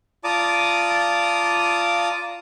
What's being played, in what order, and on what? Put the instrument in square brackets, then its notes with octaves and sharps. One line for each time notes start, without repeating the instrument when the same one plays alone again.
[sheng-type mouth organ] F4 D5 A5 A#5 D6 D#6